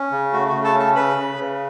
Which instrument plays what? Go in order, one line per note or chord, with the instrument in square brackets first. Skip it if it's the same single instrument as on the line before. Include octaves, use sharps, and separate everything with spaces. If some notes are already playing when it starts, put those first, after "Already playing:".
Already playing: [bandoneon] C#4
C#3
A3 F#4
C#3 F#4
A4 A5
C#4
A4 A5
C#3 B4 B5
C#3
C#3